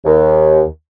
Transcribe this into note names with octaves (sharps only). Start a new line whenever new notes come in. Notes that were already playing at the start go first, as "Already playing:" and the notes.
D#2